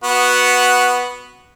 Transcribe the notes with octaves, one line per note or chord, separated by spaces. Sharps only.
B3 F#4